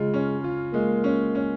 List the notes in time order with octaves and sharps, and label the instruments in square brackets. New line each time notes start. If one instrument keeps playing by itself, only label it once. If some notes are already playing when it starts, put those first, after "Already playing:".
Already playing: [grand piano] C#3 F4 [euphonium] G#3
[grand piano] C#4
F4
[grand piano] G#3 [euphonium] A#3
[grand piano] C#4
C#4